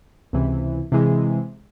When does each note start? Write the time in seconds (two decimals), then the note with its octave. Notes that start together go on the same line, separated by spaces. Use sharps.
0.33 C#2 C3 E3
0.92 C3 E3 G#3